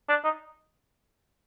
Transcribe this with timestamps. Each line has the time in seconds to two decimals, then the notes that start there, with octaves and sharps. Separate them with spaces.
0.09 D4
0.24 D#4